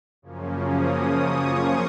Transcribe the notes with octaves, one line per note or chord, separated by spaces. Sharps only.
F#2 C#3 F3 A#3 C#4
D#6
C#6
C6